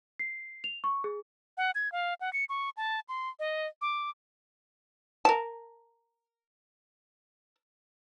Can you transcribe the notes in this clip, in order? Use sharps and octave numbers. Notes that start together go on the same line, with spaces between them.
C7
F7
C#6
G#4
F#5
G#6
F5
F#5
C#7
C#6
A5
C6
D#5
D6
A#4 A5